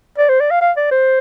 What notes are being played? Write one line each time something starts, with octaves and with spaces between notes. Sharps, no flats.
D5
C5
D5
F5
F5
D5
C5